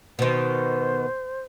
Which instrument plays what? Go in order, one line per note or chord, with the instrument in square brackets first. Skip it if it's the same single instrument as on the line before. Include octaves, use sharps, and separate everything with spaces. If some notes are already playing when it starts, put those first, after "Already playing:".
[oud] B2 D#3 [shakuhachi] C5